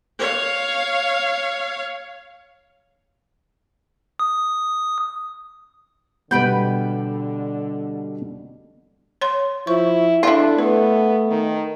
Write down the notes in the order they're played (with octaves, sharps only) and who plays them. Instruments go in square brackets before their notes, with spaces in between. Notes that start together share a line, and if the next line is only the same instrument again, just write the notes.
[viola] C#5 F5
[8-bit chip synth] D#6
[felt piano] B2 G3 [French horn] D3 [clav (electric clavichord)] B3 B4 [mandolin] G5 B5 G6
[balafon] C#5 C6
[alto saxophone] F3 [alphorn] E4 [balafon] C#6
[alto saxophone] D4 [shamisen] E4 F4 [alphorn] A4 [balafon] E5
[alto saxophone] A3 [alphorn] B3 [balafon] B4
[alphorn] D#3